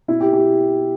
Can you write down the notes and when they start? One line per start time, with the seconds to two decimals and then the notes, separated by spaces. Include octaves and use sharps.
0.08 B2 E4
0.20 G4
0.33 G4